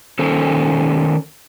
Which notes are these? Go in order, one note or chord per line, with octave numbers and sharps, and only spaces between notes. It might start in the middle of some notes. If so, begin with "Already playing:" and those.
D#3 C#4 A4 C5